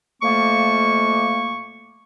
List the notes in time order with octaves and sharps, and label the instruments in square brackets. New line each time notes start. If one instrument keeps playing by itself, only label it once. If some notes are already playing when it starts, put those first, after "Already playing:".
[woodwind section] F2 A3 A#3 [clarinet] C#6